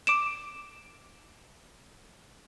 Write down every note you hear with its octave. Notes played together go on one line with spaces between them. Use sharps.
D6 D7 E7